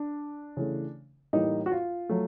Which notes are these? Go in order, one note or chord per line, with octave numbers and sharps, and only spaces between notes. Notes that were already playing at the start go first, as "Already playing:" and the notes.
Already playing: D4
C#3 E3 A3
A2 E3 G3 A#3 D#4
F#4
F4
F#3 A3